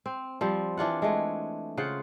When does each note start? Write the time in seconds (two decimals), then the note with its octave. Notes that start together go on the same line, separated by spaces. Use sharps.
0.06 C4
0.41 F3 G3 C4
0.77 E3 D4 F4 F#5
1.02 G#3 A3
1.77 C#3 F4 C5 F#5